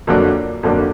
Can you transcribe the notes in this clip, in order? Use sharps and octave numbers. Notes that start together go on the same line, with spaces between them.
F2 D3 F#3 A#3 D4
F2 D3 F#3 A#3 D4